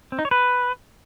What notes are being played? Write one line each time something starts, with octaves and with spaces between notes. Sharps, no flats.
C4
D#4
C#5
B4